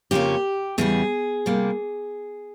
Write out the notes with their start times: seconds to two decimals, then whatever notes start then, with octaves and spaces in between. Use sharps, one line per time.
0.11 F2 C#3 F3 A#3 C#4 G4
0.78 E2 C#3 G3 G#4
1.46 C3 G3 A#3